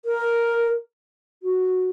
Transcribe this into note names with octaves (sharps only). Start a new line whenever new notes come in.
A#4
F#4